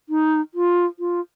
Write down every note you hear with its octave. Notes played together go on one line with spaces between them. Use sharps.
D#4
F4
F4